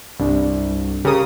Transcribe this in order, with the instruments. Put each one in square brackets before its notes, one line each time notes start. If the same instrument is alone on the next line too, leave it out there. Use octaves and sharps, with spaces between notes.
[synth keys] C2 [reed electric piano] G2 D4
[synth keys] C#3 D#6 [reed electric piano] G4 A#4